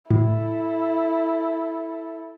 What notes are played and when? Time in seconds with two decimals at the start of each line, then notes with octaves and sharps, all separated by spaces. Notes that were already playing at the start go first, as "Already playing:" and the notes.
0.11 A2 E4 A4